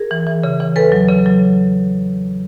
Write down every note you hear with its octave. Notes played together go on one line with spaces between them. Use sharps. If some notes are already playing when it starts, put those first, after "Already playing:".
Already playing: G#4 A#4
E3
E3
C#3
E3
E2 A4 B4
F#3
C#3
F#3